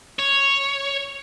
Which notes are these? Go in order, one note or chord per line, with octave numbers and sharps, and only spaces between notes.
C#5